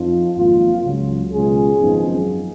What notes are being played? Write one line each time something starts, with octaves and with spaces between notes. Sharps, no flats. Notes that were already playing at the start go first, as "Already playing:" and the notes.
Already playing: F2 F3 D#4 F4
G#1 F#2 F3 A#3 F4
C#2 C#3 F#3
C#2 B2 G#3 C#4 F4 G#4
G#1 F#2 F3 B3 D#4